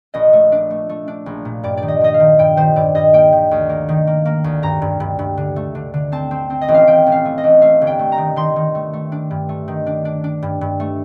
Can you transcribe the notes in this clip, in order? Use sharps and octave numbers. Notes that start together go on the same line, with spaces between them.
A#1 D#5
A3
D4
A3
A3
D4
A#1
A#2
G2 D5
D5
D#3
D#5
D#3 D#5
F5
D#3
G2 G5
D#3 C5
G2 D5
G2 D#5
A#3 G5
D#3
D2
A#3
D#3
A#3
A#3
D2
G2 A#5
G2
G2
G2
D3
A3
D3
D3
C4 A5
C4
C4
D#5
A1
F5
A1 G5
A1
F5
A3
D#5
A1
A3 F5
G1
G5
A3
A#5
D#3
D#3 C6
D#3
A3
A3
D4
G2
A3
D#3
D4
D4
D4
G2
G2
A3